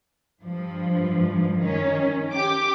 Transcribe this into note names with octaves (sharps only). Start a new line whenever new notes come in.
G2 F3
D#3 C#4
G4 D6